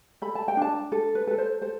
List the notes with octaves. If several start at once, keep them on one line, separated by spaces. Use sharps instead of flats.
A4 B5
A5
G5
D4 A5
A4
B4
A4 B4
C5
A4 C5